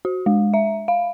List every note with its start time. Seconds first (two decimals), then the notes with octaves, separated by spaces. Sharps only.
0.05 F#4
0.26 G#3
0.54 E5
0.88 F5